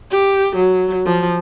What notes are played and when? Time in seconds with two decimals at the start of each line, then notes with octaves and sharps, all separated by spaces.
0.11 G4
0.56 F#3
1.05 F3